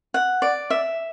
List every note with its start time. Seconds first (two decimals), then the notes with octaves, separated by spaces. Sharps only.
0.14 F#5
0.42 D5
0.70 E5